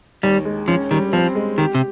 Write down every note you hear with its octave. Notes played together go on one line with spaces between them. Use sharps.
D#2 G3
G#3
F3 C#4
D#3 G3
F3 C4
G#3
D#3 G4
C3